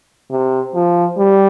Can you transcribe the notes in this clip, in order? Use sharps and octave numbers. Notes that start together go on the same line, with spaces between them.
C3
F3
G3